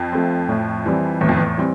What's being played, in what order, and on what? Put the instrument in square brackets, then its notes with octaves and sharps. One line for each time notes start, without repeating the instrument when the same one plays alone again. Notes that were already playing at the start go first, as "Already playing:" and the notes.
Already playing: [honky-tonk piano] F2
[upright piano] F3 A3 C4
A2
E3 G3 C4
[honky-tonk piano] E2 [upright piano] A2
[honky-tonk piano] F2
E2
[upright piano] E3 G3 C4